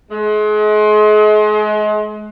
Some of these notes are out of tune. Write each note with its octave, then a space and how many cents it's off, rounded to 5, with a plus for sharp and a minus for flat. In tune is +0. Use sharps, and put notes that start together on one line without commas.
G#3 +35